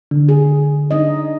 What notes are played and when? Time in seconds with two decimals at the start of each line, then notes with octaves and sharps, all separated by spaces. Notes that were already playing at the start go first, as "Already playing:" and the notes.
0.11 D3
0.29 G#4
0.91 D4 D#4 D#5